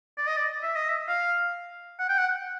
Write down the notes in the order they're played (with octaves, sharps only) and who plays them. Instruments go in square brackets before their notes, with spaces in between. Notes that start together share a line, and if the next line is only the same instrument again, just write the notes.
[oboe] D5
D#5
D5
E5
D#5
E5
F5
F#5
G5
F#5